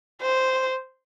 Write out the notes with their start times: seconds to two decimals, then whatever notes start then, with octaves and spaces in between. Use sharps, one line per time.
0.22 C5